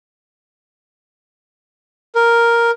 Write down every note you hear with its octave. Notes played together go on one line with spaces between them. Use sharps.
A#4